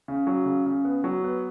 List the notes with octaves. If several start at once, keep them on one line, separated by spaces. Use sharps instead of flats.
C#3
F#3
C#3
C#3
B3
F#3
B3